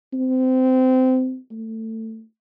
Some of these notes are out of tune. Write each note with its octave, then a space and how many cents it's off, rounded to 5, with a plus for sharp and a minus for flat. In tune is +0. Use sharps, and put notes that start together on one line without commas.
C4 -20
A3 +20